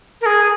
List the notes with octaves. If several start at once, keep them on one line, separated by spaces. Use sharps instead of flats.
A#4
G#4